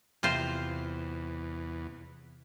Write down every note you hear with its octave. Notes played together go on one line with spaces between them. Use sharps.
E2 C3 F4 C5